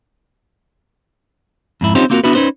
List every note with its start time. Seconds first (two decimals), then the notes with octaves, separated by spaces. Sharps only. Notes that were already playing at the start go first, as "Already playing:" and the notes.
1.81 F2 G#2 E4
1.95 C4 C#4 D#4 F4 G4 C5
2.10 A#3 C4 F4 F#4 A4 A#4
2.24 B3 D4 E4 F#4 B4
2.35 C#4 D#4 B4 C5